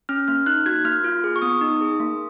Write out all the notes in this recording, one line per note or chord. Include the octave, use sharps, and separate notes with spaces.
C#4 F6
A#3 F6
D#4 F#6
F#4 G#6
A#3 F6
F4
G#4
C#6
B3 D#6
D#4
G#4
A#3